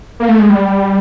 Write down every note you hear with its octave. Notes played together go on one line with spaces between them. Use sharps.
A#3
A3
G#3
G3